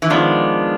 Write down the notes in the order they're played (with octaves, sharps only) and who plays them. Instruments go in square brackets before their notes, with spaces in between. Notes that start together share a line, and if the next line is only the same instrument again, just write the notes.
[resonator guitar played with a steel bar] E3
[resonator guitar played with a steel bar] D#3 F3 [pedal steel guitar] G#3 B3 D4